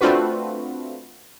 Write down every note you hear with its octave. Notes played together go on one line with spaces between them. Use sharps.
A3 C4 D4 F4 F#4 B4